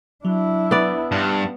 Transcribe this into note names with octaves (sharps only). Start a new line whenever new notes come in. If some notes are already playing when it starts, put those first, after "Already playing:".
F#3 D4 E4
B3 D5
G2 A5 C6